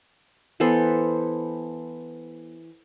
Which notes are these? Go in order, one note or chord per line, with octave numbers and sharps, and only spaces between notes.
E3 B3 A4 C5